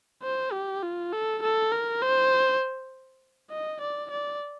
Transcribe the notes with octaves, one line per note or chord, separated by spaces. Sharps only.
C5
G4
F4
A4
A4
A#4
C5
D#5
D5
D5